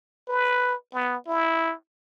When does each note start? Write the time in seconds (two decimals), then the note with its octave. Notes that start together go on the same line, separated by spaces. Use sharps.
0.28 B4
0.94 B3
1.27 E4